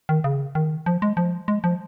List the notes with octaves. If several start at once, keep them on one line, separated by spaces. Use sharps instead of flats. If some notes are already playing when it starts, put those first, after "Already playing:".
D#3
C#3
D#3
F3
G#3
F3
G#3
F3